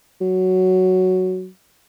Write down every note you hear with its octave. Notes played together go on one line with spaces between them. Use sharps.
F#3